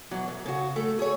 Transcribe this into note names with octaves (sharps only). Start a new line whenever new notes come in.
B2 E3 F#3
F#2
C#3 F#4
A3
G#4 C#5